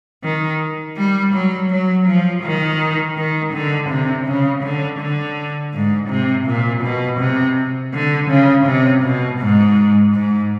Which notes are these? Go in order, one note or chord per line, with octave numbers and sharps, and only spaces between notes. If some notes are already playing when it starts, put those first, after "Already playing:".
D#3
G3
F#3
F#3
F3
D#3
D#3
D3
C3
C#3
D3
D3
G#2
C3
A#2
B2
C3
D3
C#3
C3
B2
G#2
G#2